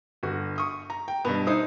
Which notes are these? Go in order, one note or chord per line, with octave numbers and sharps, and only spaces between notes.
G1 F#4
C#6 D#6
A#5
G5
G2 B2 B3
D#4 E4 C5 D#6